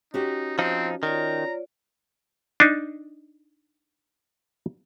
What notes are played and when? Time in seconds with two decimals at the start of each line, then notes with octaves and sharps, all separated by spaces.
0.14 C#4 D#4 F#4 G4
0.59 F3 C4 D#4
1.03 D#3 F4 C#5 D5 A#5
2.60 D4 D#4